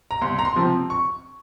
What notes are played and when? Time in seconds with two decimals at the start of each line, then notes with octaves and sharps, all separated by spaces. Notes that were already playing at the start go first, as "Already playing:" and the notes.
0.11 A#5
0.21 C2 C6
0.39 A#5
0.45 C6
0.56 C3 F3 C4
0.90 C#6